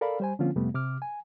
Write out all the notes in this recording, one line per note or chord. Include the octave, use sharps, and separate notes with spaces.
A4 A#4 D5 F5 B5
G3 C5 G#5
D3 F3 A#3 C4 C#4 F4
F2 C3 G3 A3 B3
C3 D6 F6
G#5